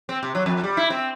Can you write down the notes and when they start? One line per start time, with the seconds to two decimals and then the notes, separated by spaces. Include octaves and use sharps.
0.09 C4
0.23 C3
0.35 F#3
0.46 F2
0.64 G3
0.77 E4
0.90 C4